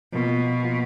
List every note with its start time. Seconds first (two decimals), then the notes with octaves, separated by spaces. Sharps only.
0.12 B2 F3 A#3 F4
0.63 F3 A#3 F4